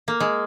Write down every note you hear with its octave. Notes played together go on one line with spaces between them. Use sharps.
A#3
G#3